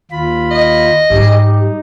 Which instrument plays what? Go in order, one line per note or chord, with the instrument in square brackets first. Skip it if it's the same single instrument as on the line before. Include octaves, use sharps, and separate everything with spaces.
[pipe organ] D#2 F4 B5
[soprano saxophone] D#5
[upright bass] G#2 G3 [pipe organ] D#4 [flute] G4